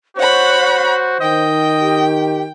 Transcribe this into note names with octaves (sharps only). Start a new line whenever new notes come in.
F#4 C5 C#5 F#5 B5
D#3 D#5 G5
G4